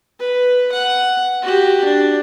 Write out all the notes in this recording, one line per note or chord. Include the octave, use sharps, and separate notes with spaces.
B4
F#5
F#4 G4
D4